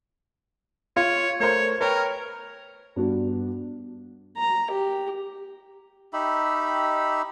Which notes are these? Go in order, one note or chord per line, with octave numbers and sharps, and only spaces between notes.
F4 C#5
A3 A#4 C5 C#5
A#4 B4 C#5 G5
G2 B3 D4 F#4
A#5
G4
D#4 G4 E5 B5